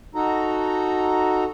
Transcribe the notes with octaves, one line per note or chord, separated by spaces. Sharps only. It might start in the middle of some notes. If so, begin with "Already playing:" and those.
D#4 F#4 A4 A#5